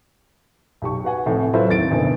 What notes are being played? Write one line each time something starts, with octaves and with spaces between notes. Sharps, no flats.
B1 G4 C#6
F#4 B4 F#5 G#5
F1 A2 C3 A3
F#3 A3 E4 F4 B4 C5
D#2 C4 A6 D7
F1 D2 B2 D#3